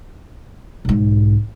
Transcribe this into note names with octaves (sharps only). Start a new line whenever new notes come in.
B1 G#2